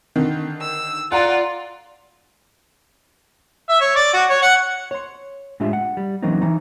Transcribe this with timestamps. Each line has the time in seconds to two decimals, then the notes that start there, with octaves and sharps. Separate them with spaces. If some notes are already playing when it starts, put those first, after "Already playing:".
0.16 D3 D#3
0.61 E6
1.12 F4 D5 F#5 A#5
3.69 E5
3.80 C#5
3.95 D5
4.13 F#4
4.29 C#5
4.42 F#5
4.91 C#5 C6
5.60 A2 G#3 D4 F4 G4 E5
5.73 F#5
5.97 G3
6.22 E3 F#3 A#3 C4 C#4 D#4
6.42 E3 D#4